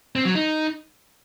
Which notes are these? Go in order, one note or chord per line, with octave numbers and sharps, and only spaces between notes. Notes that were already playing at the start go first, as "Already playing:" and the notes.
C4
F#3
D#4